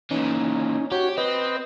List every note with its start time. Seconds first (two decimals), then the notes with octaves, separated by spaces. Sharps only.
0.11 A#2 E3 C#4 D#4
0.92 F#4 G4 C#5
1.17 C4 B4 D#5